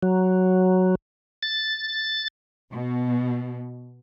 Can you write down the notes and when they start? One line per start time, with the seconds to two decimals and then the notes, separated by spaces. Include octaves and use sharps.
0.03 F#3
1.43 A6
2.72 B2